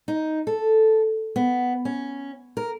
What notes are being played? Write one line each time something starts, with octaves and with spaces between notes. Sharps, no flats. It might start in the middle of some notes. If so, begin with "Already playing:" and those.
D#4
A4
B3
C#4
A#4